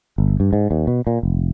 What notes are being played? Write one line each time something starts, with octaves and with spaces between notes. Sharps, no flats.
G1
G2
G#2
D#2
B2
A#2
F1